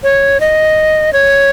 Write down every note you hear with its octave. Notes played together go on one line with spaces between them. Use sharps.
C#5
D#5
C#5